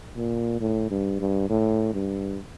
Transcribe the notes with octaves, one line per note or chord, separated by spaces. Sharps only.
A#2
A2
G2
G2
A2
G2